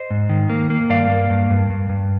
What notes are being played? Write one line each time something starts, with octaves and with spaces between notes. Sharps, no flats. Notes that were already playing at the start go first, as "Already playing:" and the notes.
Already playing: C5 D#5
G#2
D#3
A#3
A#3
G2 D5 F5
A#3
G2
G2
G2
G2